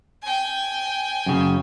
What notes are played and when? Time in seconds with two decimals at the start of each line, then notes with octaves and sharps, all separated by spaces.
0.22 G5 G#5
1.26 F#2 C#3